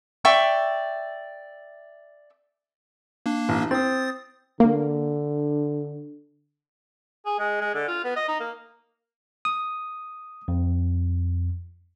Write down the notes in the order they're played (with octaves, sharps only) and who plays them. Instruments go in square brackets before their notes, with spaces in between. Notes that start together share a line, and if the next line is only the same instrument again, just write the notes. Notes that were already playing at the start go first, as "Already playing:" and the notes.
[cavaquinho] D5 E5 G5 C#6
[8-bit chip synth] A#3 D4
[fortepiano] A1
[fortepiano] C4 [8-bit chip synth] D#6 A6
[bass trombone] D3 [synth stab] A#3
[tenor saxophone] G#4
G#3
G#3
D3
F4
B3
D#5
D#4
A#3
[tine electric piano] D#6
F2